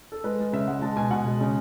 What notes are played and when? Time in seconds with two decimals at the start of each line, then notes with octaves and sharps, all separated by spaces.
0.12 A4
0.24 G#3 B4
0.39 G#3
0.53 C#3 E5
0.67 G#3 F#5
0.82 G#3 A5
0.96 B2 G#5
1.11 B2 F#5
1.25 G#3
1.41 C#3